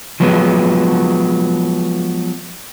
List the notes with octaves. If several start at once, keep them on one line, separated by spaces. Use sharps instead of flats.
F3 F#3 G#3 B3